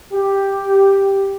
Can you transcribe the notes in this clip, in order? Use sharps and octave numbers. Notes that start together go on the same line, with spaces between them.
G4